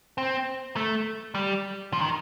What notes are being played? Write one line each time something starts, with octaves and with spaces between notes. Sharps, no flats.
C4
A3
G3
F3
D#3